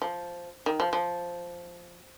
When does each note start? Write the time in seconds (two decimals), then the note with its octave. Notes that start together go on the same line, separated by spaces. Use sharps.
0.02 F3
0.66 D#3
0.80 F3
0.93 F3